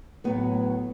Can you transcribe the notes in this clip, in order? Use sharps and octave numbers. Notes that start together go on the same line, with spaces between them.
A2 F#3 B3